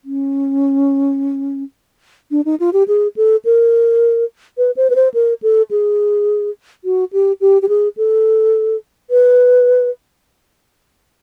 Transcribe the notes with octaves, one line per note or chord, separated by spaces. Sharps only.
C#4
D4
D#4
F4
G4
G#4
A4
A#4
B4
C5
B4
C5
A#4
A4
G#4
F#4
G4
G4
G4
G#4
A4
B4